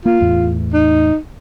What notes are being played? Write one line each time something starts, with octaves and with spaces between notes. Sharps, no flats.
A#3 F4
E2 A2
D#4